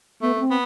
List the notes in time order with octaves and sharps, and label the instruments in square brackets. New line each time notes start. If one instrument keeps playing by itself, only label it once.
[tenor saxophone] A3 [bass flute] B3
[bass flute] B3
C4
[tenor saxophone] B3